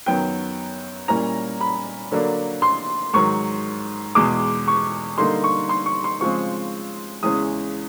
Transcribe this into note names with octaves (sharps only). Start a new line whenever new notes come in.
F#2 D#3 F#3 B3 G5
A#2 G3 A#3 C#4 E4 A#5
B5
D3 F#3 A#3 D4
C6
G#2 D#3 F#3 C#6
E2 B2 G#3 D6
C#6
D3 G3 A#3 D#4 C6
C#6
C6
C#6
C6
C#3 F3 G#3 C4 C#6
E2 C#3 E3 G#3 C#4 D#6